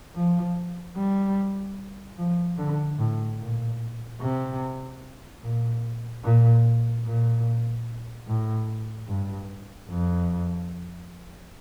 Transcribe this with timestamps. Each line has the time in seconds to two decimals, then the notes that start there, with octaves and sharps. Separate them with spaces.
0.16 F3
0.96 G3
2.18 F3
2.58 D3
2.99 A2
3.40 A#2
4.21 C3
5.43 A#2
6.24 A#2
7.06 A#2
8.27 A2
9.08 G2
9.89 F2